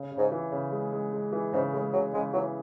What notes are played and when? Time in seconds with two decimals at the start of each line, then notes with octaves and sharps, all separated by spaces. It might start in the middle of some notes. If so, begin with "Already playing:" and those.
Already playing: C#3
0.11 C#3
0.18 G#2
0.31 E3
0.52 C#3
0.72 G#3
0.92 G#3
1.13 G#3
1.32 E3
1.53 G#2 C#3
1.73 A2 G#3
1.93 C#3 F#3
2.13 C#3 G#3
2.33 E3 F#3